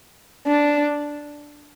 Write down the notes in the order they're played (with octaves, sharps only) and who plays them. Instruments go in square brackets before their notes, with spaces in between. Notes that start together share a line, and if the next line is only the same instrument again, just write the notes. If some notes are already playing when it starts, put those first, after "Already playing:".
[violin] D4